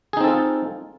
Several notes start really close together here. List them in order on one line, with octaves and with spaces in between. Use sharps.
G#4 D#4 C4 A4 F4